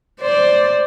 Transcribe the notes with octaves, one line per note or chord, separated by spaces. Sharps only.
C5 D5